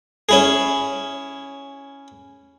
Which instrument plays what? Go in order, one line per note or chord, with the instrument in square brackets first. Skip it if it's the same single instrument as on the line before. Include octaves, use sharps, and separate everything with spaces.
[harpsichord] C#4 E4 G#4